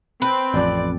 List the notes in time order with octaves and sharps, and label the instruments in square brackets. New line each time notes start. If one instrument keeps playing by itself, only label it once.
[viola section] C4 [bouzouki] B4
[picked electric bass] A1 F2 [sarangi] D5